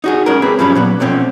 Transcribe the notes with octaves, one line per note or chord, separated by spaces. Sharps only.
D#4 F#4 G#4
C#3 G#3 A#4
C4 G#4 B4
G2 C#3 F3 F#3 C#4 B5
A#2 F#3 B3
B2 F3 A3 C4 C#4